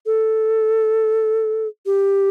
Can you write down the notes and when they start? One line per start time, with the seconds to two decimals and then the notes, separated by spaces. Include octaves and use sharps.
0.06 A4
1.86 G4